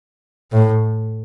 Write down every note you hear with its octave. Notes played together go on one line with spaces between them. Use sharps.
A2